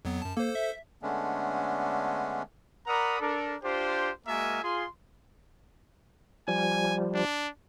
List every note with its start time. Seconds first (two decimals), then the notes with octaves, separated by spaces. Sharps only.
0.05 F2 F#3 B3
0.22 F#2 A5
0.37 A#3 A4 C5
0.55 E5
1.02 D3 G#3 A3 B3 C#4 D4
2.87 A#4 D5 F#5 A#5 B5 D#6
3.20 D4 A4 A#4
3.63 D4 F4 G4 C5
4.26 G#3 A#3 F#4 A#4 E5 G#5
4.63 F4 G#4 C6
6.48 F3 G3 G#5
7.14 D4